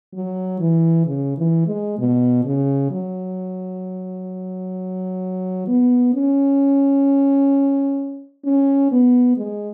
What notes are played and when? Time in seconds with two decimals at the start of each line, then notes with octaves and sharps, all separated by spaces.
0.14 F#3
0.60 E3
1.06 C#3
1.37 E3
1.67 G#3
1.98 B2
2.45 C#3
2.91 F#3
5.68 B3
6.14 C#4
8.45 C#4
8.92 B3
9.37 G#3